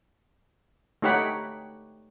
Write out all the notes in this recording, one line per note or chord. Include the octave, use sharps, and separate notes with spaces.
A3 D#4 G4 C#5 F#5 B5